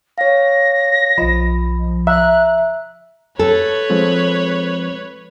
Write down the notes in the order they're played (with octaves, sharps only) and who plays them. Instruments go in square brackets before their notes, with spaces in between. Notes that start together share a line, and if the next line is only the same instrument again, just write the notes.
[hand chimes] C#5 F5 [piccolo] A#6
[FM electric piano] B1 F3 [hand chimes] D#5 B5
[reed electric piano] E5 [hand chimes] A#5 [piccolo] F#6
[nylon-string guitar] A4 [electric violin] B4 C#5
[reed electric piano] F3 G#3 C4